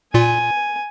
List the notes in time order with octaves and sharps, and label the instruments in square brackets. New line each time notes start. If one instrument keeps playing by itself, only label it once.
[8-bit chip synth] A#2 F4 [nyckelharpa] G#5